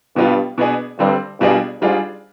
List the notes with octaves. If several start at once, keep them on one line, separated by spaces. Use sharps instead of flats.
G2 B2 G3 B3 F4
B2 B3 D4 G#4
G2 D3 G3 C4
G2 B2 G3 D4 F4 G#4
G#2 G3 D4 F4 G#4